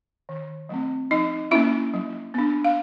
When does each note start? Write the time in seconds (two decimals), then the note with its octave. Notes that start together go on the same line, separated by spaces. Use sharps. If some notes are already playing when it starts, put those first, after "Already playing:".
0.29 D#3
0.69 F#3 A3 C4
1.10 F3 D#4 D#5
1.51 A#3 C#4 E4 E5
1.94 F#3
2.34 B3 D4
2.65 F5